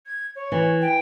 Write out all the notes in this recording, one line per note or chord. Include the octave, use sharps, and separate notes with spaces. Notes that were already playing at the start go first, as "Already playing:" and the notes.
G#6
C#5
E3
G5